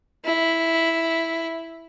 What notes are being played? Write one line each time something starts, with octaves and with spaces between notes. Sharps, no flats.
E4